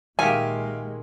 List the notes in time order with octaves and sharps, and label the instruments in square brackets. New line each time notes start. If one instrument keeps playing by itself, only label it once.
[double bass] A#2 G#3 [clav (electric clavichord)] D#3 G4 [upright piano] E5 F5 G5 [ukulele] G#5